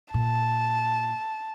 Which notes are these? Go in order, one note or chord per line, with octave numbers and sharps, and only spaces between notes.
A#2 A5